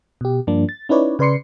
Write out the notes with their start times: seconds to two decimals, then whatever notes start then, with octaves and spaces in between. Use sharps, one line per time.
0.21 B2 G4
0.47 G2 F3 A#3 D4
0.69 A6
0.89 C#4 D#4 E4 B4 C#5 D5
1.19 C#3 B4 D5 C6 C7 C#7